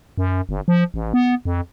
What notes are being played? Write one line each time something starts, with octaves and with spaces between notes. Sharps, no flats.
F#2
G1
F3
A1
B3
F2